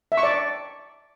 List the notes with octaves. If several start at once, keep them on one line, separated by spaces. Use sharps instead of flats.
E5
C#6
D5